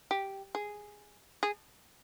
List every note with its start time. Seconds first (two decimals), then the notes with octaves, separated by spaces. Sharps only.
0.11 G4
0.55 G#4
1.43 G#4